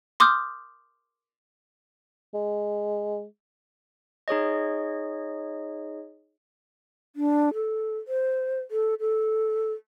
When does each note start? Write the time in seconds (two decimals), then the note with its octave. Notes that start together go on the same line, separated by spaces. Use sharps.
0.20 C6 D6 D#6 F6 G6
2.34 G#3
4.28 D#4 G#4 C#5 D#5
7.16 D4
7.54 A4
8.08 C5
8.71 A4
9.00 A4